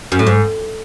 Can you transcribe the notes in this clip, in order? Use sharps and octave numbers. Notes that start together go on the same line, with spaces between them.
F#2
A2
G#2